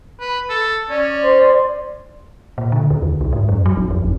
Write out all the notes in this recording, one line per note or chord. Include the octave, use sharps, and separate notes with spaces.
B4
A4
C#4 D5
C5
A#2
D3
D#2
D2
C2
G#2
F#2
F#3
A1
F2
G1